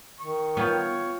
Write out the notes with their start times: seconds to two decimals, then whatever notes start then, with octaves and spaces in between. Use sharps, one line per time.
0.20 D#3 C#6
0.57 B3 F4 C#5 G5